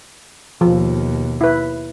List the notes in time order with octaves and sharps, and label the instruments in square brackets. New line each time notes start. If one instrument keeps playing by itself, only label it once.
[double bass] D#2 B2 [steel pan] F3
[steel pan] E4 B4